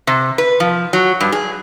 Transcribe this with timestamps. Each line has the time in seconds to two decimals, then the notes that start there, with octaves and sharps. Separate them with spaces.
0.07 C3
0.38 B4
0.60 F3
0.93 F#3
1.21 G2
1.32 G#4